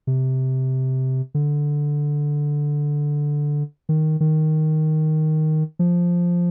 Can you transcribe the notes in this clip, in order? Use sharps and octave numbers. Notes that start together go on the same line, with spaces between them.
C3
D3
D#3
D#3
F3